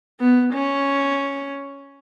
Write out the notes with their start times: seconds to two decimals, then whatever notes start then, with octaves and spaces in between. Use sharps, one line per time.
0.20 B3
0.53 C#4